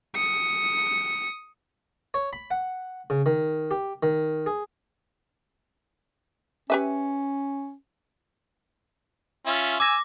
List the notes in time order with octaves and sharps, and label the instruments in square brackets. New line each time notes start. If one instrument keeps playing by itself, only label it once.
[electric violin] D#6 C#7
[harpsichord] C#5
B5
F#5
C#3
D#3
G4
D#3
G#4
[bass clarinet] C#4 [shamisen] G4 B4 E5
[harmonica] C#4 F4 E5
[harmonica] G#5 E6 [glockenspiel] D6 A#6